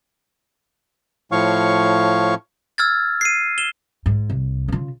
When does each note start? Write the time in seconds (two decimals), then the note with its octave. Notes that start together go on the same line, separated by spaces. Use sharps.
1.32 A2 F3 C#5 F5 C#6
2.78 E6 F6 G#6 A6
3.21 C7 D#7
3.58 E7 G7
4.06 G#2
4.30 C2
4.68 C#3 F4